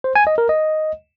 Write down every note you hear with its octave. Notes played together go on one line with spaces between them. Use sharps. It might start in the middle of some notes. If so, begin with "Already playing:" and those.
C5
G#5
D#5
A#4
D#5